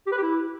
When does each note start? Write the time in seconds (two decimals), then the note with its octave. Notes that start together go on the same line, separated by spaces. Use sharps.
0.07 G4
0.12 B4
0.17 G4
0.22 E4